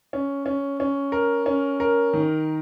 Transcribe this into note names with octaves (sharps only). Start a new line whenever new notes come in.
C#4
C#4
C#4
A#4
C#4
A#4
D#3